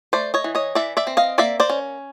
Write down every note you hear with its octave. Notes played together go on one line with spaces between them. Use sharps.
A3 C5 D5
C#5 D#5
E3
C#5 D#5
E3 D5 E5
D5 E5
C4
D#5 F5
A#3 D5 E5
C5 D5
C#4